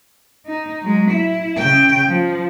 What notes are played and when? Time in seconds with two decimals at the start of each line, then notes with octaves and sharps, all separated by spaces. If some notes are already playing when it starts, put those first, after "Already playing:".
0.46 D#4
0.82 F#3 G#3
1.11 E4
1.58 C#3 G5
2.09 F3